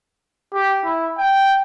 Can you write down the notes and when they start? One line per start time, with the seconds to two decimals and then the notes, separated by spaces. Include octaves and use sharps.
0.53 G4
0.85 E4
1.18 G5